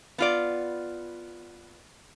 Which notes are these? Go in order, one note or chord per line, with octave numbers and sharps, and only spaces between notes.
B3 F4 D5